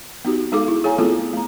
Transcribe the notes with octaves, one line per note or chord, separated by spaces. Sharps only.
B3 D#4 F#4 G4
G#3 D#4 G#4 A4 F5 D6
E4
G#4 A4 C#5 F5 G#5 A#5
A3 B3 C4 F4 A4
A3 A#5